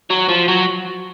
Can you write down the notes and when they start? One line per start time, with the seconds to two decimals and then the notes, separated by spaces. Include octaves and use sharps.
0.10 F#3
0.29 F3
0.48 F#3